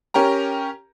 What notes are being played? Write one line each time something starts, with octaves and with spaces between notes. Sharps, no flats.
C#4 G4 A#4 A#5